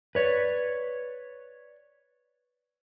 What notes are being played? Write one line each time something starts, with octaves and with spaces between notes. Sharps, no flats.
B4 C#5 D5